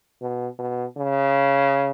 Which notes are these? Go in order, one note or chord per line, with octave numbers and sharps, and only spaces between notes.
B2
B2
C#3